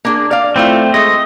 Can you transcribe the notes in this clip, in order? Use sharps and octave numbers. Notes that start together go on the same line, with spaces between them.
A#3 D4 G#4
D5 F5
A3 C4 E4 F4
G#3 A3 D#5